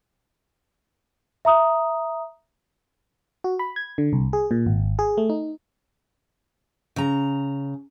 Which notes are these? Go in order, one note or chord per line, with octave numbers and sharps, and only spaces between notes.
E5 A#5 D#6
F#4
B5
G#6
D3
C2
G#4
A#2
G#1
G#4
A3
D#4
C#3 A#5